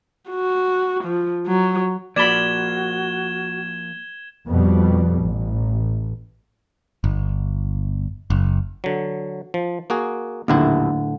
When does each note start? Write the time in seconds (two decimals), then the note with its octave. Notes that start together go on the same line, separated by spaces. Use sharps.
0.30 F#4
1.04 F3
1.47 F#3
2.16 F3 A#3 F#4 D5 B5 G#6 E7 G7
4.47 F2 B2 G3
5.21 A1
7.04 G1
8.30 F#1
8.84 D3 F#3
9.54 F3
9.90 A#3 F#4 G#4
10.48 A#1 D#2 A2 D3 E4